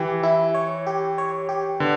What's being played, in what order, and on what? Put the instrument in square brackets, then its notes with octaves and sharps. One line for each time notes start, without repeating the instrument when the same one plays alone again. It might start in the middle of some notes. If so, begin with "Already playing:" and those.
Already playing: [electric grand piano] E3 [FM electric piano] G4
[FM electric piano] E4
C#5
G4
C#5
G4
[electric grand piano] D3 [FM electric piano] B3